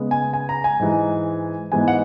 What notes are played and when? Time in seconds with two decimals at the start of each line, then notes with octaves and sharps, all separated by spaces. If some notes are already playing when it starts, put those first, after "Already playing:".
Already playing: C#3 G#3 B3
0.11 G#5
0.33 G#5
0.49 A#5
0.64 G#5
0.79 G#2 E3 G#3
1.72 G#2 E3 G#3 B3 G#5
1.88 F#5